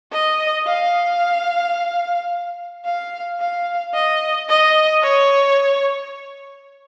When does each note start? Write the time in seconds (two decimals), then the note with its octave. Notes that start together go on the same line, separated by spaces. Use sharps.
0.12 D#5
0.66 F5
2.85 F5
3.40 F5
3.94 D#5
4.49 D#5
5.03 C#5